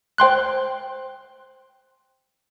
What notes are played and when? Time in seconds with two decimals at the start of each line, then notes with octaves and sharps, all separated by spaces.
0.18 C5 G5 C6 F#6